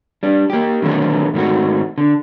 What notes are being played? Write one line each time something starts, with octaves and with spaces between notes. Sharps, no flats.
G3 D4
A#3 G4
D3 D#3 F#3 A3 B3
G#2 D#3 A3 F#4
D3